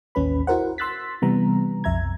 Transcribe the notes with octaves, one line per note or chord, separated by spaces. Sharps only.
A1 D#2 C#4 B4 B5
E4 F#4 A#4 C5 F#5
C6 E6 F#6 A6 B6
C3 E3 G3 B3 A#5
B1 F2 E5 A#5 G#6